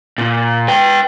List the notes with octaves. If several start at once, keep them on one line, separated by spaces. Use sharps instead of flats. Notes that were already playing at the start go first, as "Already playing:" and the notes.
A#2
B4 G5